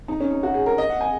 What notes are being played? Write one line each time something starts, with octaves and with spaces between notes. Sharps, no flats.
D#4
C#4
D#4
F#4
G#4
A#4
D#5
F#5
G#5